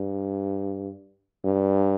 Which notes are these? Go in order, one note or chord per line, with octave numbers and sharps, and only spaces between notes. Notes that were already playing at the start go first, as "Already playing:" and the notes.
Already playing: G2
G2